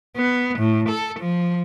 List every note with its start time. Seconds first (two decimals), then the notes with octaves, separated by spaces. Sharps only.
0.17 B3
0.59 A2
0.89 A4
1.20 F3